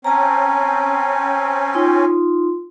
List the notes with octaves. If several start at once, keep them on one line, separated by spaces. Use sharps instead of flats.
C4 C#4 A5 A#5
D#4 F4 C6